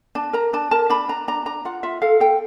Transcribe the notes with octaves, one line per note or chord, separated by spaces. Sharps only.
D4 A5
A#4 A#5
D4 A5
A#4 A5
D4 B5
D4 A#5
D4 A#5
D4 A#5
F4 F#5
F4 E5
A4 F5
A4 G5